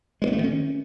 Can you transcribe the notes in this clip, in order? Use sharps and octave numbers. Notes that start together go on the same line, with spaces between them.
G#3
B3
A3
D#3
C#4